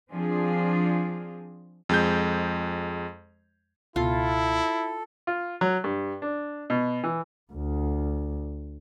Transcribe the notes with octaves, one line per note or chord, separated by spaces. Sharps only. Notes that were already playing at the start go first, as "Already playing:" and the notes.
F3 C4 D4 F4 G#4
F2 G#3 G6
C#2 B2 E4 F4 A4
F4
F#3
G2
D4
B2
E3
D2